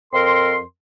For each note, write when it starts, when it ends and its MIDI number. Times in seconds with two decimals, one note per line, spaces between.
0.14 0.61 41
0.14 0.61 60
0.14 0.61 70
0.14 0.61 84